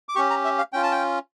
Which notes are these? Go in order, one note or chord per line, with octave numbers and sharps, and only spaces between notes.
D6
C#4 G4 C#6
A#5
E5
F5
C#4 F4 G5
A5
G5